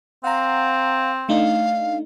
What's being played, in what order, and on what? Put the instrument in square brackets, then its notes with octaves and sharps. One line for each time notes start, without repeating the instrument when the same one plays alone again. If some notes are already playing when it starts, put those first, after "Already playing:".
[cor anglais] C4 [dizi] F5 [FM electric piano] F#5 A#5
[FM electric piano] A3 D4 D#4 [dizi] F5